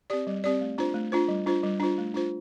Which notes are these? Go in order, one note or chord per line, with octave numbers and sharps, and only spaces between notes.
C4 G4 D5
G3
C4 G4 D5
A3
D4 F4 C5
A3
D4 F4 C5
G3
D4 F4 C5
G3
D4 F4 C5
A3
D4 F4 C5